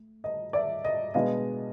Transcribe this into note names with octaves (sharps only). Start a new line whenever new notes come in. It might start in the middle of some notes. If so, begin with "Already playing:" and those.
Already playing: A3
D#5
D5 E5
D#5
B2 G#3 B3 D4 D#5 F5